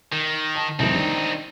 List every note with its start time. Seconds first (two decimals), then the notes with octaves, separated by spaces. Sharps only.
0.12 D#3
0.55 A5
0.79 F1 C2 C4 D#4
0.95 D#3 D4